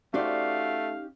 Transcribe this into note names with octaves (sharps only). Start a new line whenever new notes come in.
A3 C#4 D#4 F#4 G4 C5 D5 F5